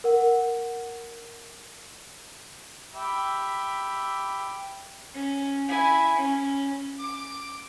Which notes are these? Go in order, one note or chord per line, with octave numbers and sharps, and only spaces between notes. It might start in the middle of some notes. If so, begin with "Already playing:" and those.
A#4 F#5
G4 E5 B5
C#4
E4 G#5
C#4
D6